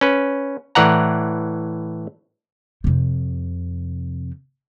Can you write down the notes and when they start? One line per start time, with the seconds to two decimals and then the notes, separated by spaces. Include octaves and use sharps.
0.01 C#4 B4
0.75 A2 E3 D5 F#5 A#5
2.84 F2 C3